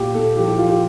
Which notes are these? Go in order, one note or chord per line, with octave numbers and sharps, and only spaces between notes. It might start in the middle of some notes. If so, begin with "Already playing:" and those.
Already playing: A#2 G4
A#2 A4
F3 G4
G4
F3 F4
G4